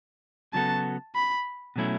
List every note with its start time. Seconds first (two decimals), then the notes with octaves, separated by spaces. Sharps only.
0.53 C#3 F#3 B3 F#4 A4 A5
1.15 B5
1.76 B2 F#3 A3 C#4 E4